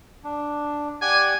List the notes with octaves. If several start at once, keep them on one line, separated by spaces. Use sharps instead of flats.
D4
G4 D5 F#5 G#5